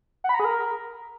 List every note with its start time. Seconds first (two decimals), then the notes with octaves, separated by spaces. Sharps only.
0.24 F#5
0.29 B5
0.34 A#5
0.40 G#4
0.45 A#4